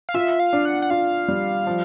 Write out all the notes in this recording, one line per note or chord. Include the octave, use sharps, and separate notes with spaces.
F5
F4 E5
F5
D4
F#5
F#5
F4 F5
G3
F3